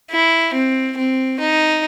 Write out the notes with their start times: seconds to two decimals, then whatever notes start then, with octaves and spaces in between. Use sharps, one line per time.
0.11 E4
0.54 C4
0.97 C4
1.40 D#4